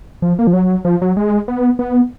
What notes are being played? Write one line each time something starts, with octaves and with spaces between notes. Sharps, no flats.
F3
A#3
F3
F#3
F3
F#3
G#3
B3
B3